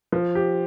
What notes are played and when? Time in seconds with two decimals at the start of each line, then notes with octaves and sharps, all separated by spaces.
0.12 F3
0.35 G4